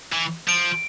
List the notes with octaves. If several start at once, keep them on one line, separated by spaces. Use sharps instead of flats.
E3
F3 D7